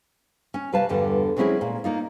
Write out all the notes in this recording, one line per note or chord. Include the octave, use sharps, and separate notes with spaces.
C#4
C3 G3 B4 F5 A5
E2 G2 D3 G3
F#3 G#3 C4 C#4 E4 G#4
A#2
A#3 D#4 F4